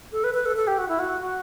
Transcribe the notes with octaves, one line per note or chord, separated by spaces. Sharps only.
A4
B4
B4
A4
A4
G4
F#4
E4
F#4
F#4